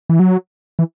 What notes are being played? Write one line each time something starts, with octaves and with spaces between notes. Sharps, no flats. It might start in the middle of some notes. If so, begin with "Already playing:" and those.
E3
F#3
E3